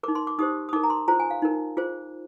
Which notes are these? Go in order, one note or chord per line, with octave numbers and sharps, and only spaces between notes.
D#4 A#4 D6
C6
D6
D#4 G4 C5 D#6
D#6
D#4 A#4 D6
A#5
C6
F4 G#4 C5 A#5
G#5
F5
D#4 A#4
F4 G#4 C5